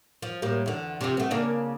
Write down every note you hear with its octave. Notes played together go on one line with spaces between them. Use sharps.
F3
A2 G3 A#3
E2 D3
C3 F3
A3 B3
C#3 A#3 D4